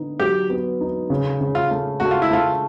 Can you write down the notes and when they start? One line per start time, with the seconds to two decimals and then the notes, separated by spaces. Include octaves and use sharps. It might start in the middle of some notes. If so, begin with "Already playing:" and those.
Already playing: D3 B3 D#4
0.20 F#3 G4
0.50 B3
0.81 D#4
1.10 C#3
1.41 C#3
1.55 F4
1.71 A3
2.00 A3 F#4
2.11 F4
2.22 E4
2.30 A3 F4